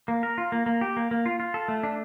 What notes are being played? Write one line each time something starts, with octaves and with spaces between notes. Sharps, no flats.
A#3
A#4
F4
A#3
A#3
G4
A#3
A#3
F4
F4
A4
A3
D4